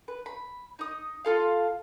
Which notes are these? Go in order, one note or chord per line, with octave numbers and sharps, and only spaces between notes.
B4
B5
D#4 D#6
F4 A4 F5